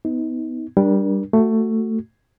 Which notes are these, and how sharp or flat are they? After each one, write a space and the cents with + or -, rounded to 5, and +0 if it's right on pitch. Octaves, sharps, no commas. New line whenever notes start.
B3 +20 D#4 +30
G3 +0 D4 +0 A#4 +30
A3 +15 F#4 +0